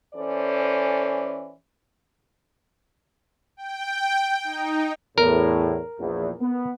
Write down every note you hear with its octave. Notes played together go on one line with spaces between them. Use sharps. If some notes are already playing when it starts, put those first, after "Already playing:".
E3 C#4 A4 C5 D5
G5
D#4
E2 A2 A#4
A#1 E2
B3